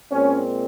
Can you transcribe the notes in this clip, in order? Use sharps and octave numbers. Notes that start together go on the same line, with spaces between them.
A#2 G#3 C4 C#4